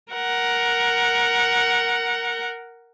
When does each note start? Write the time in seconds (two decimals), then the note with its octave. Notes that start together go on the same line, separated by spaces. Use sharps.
0.13 A#4 F#5